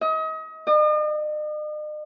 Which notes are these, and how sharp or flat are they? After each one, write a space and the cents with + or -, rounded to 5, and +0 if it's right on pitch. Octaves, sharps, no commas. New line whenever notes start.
D#5 +35
D#5 -45